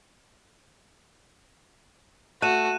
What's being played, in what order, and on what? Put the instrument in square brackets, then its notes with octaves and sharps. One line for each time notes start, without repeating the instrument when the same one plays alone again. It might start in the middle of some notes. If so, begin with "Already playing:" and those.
[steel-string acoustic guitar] A3 [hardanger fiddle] F#4 [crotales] F#6 D#7 E7